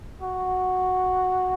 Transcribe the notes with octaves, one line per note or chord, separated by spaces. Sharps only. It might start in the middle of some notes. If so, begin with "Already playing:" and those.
F#4